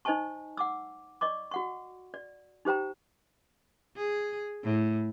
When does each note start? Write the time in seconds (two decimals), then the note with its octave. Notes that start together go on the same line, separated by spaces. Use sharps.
0.05 D#4 C5 D#5 G#5 A5 C#6
0.57 F#5 D6 E6
1.21 D5 D#5 C#6 D6
1.51 F#4 F#5 C#6
2.14 D5
2.65 D#4 G4 C5 G5 A#5
3.97 G#4
4.64 A2